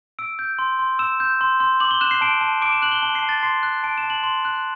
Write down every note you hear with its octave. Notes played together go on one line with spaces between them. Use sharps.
E6 D7
G6
C6
C6
E6 E7
G6
C6
C6
D6 F#7
G7
F#6 E7
C7
A5 D7
A5
D6 D7
E7
F#6 F#7
G7
A5 G7
C7
A5
A6
C6 C7
F#6
A5 D7
E7
A5
F#7
C6 F#7
F#6